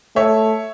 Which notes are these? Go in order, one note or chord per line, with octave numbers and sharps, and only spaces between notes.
A3 C#5 E5